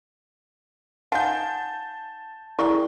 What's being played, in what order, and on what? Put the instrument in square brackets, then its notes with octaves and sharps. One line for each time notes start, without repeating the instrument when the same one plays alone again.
[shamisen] D#4 F4 [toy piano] F#5 G#5 [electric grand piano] A5 G6
[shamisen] G#3 G4 A#4 [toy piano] E4 D5 C#6